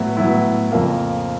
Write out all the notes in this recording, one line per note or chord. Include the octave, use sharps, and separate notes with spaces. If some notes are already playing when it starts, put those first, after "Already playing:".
Already playing: A2 F#3 B3 E4
A2 F#3 B3 E4
F2 C#3 F3 A#3